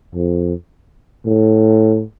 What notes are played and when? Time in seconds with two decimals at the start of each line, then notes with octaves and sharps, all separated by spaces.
0.15 F2
1.26 A2